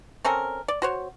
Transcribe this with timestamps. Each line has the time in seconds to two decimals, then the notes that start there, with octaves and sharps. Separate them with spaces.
0.24 C4 C#4 A4 A#4
0.68 D5
0.82 F#4 C5 C#5